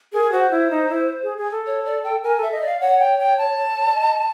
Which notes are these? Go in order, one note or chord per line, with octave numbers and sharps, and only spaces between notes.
G#4 A#4
F#4 C5
E4
D#4
E4
G#4
G#4
A4
C#5
D5
G5
A#4 G#5
A4 E5
D#5
D5 F5
C#5 F#5
G5
G5
A5
C#5
D5
D#5